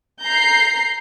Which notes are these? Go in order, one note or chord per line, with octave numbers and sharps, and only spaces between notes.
A#5 G6 C7